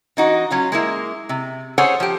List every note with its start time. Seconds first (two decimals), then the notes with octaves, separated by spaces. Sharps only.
0.17 E3 D#4 F#4
0.51 F#3 C#4 F4
0.72 G#3 A#3 E4
1.29 C3
1.78 G#4 A4 C5 C#5 F#5 G#5
2.00 F3 G4